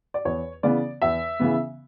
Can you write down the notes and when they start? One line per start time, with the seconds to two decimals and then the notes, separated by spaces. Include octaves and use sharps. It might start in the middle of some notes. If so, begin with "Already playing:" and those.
0.14 D5
0.25 E2 C#5
0.63 C#3 E3 B3 D5
1.02 E2 E5
1.40 C#3 E3 B3